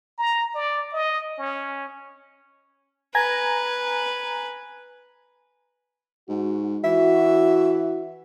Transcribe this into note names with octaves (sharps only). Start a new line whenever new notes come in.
A#5
D5
D#5
C#4
B4 G#5 A#5 G#6
G#2 F#4
E3 F#4 E5